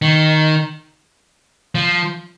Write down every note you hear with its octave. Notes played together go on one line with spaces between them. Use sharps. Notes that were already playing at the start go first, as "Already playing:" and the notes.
D#3
F3